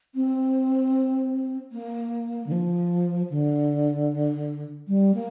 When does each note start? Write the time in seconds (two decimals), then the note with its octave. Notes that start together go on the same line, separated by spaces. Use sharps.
0.15 C4
1.72 A#3
2.46 D3
2.51 F3
3.30 D3
4.88 G3
5.14 A#3